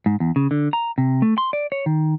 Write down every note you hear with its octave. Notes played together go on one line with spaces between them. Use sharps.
G#2
E2
C#3
D3
A#5
C3
A3
C6
D5
C#5
D#3